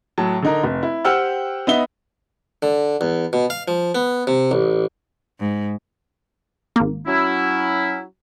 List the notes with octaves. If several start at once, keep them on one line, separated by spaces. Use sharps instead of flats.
A2 F#3 A5
D3 D#4 A#4
F1
E4
G4 C5 F#5 G5 E6 F6
B3 D#4 E5 G7
D3
E2
B2
F5
F3
B3
C3
A1
G#2
G#1 A#3
F#3 C#4 E4